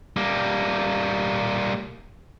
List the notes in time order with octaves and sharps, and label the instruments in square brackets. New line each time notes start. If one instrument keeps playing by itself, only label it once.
[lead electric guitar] G3 A#3